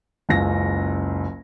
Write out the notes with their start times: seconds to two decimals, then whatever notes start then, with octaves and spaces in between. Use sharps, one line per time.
0.29 F#1 C#2 A#6